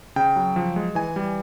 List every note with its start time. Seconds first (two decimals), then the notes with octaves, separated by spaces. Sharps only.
0.16 C#3 G5
0.36 F#3
0.56 F3
0.76 G#3
0.95 E3 G#5
1.16 G3